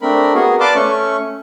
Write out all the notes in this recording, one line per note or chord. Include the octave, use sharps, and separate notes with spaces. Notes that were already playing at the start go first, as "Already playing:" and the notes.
A3 C4 D4 A#4 B5
B3 F#4 G#4 A#4
B4 D5 F5 A5 C6 D6
A3 C#4 C#6